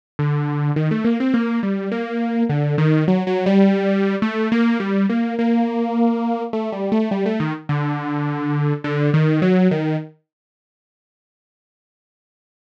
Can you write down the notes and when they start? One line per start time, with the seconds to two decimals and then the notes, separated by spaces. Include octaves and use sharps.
0.19 D3
0.76 D#3
0.91 A3
1.05 A#3
1.20 C4
1.34 A#3
1.63 G3
1.92 A#3
2.49 D3
2.78 D#3
3.08 F#3
3.27 F#3
3.46 G3
4.22 A3
4.52 A#3
4.80 G3
5.10 A#3
5.39 A#3
6.53 A3
6.72 G3
6.92 A3
7.11 G3
7.26 A3
7.40 D#3
7.69 D3
8.84 D3
9.14 D#3
9.42 F#3
9.71 D#3